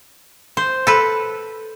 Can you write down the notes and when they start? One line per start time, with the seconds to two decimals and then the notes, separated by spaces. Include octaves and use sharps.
0.57 C5
0.87 A4 B4